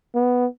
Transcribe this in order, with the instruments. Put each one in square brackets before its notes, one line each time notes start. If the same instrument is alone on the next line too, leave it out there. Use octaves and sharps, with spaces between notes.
[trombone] B3